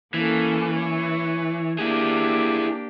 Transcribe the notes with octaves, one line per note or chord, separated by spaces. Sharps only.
E3 A#3 C#4 A4
C#5
A#3 D4 E4 G4 G#4